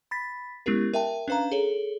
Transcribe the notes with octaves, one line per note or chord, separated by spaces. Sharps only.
B5 A6 B6
G#3 B3 C#4 E4 G4 A#4
A#4 E5 G5 A5
C#4 D4 B4 F5 A#5
G#4 A4 C#5